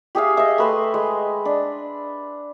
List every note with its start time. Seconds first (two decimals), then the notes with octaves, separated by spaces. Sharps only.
0.15 G4 G#4 E5 F5
0.37 D#5 E5
0.58 A3 B4 C6
0.94 G#3
1.45 D4